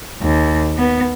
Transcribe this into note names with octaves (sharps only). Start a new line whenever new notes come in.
D#2
B3